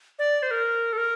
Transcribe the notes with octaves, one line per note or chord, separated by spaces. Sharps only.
D5
C5
A#4
A4
A#4